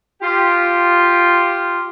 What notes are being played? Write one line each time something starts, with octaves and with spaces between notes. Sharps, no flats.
F4 G4